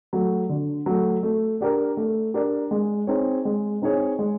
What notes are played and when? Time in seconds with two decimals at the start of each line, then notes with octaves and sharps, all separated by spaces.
0.13 F#3 A3
0.49 D3
0.86 F#3 A3
1.23 A3
1.61 D4 G4 A#4
1.97 A3
2.34 D4 G4 A#4
2.71 G#3
3.07 C4 D#4 G#4 C#5
3.45 G#3
3.82 C4 D#4 G#4 C#5
4.19 G#3